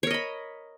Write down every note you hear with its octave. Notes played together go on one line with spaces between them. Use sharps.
A#4 C#5 D#5 B5